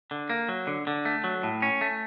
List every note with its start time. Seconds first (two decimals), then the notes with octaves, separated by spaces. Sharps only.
0.11 D3
0.30 A#3
0.49 F#3
0.67 D3
0.87 D3
1.05 A3
1.24 F#3
1.43 A2
1.62 C#4
1.81 A3